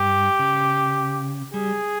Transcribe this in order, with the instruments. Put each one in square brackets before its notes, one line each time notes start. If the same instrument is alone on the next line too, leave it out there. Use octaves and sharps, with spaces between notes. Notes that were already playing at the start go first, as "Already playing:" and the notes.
Already playing: [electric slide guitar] G2 [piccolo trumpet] G4
[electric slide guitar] C#3
[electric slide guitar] G3 [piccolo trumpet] G#4